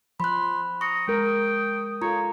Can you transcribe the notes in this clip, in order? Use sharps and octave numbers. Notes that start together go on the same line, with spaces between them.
F3 B5 C6 F#6
A#5 C#6 D#6 C#7
G#3 A#4 G5
F4 A4 C#5 A#5